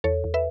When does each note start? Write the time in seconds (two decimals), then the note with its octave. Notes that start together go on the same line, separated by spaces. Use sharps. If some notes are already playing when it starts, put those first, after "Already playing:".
0.04 E2 A4 C#5
0.24 E2
0.34 B4 E5